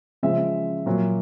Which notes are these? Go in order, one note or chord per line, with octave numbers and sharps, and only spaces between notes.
C#3 F3 G#3 E5
A#2 F#3